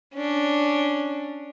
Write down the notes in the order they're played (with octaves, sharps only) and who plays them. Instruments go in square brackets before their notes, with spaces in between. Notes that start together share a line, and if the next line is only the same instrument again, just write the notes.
[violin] C#4 D4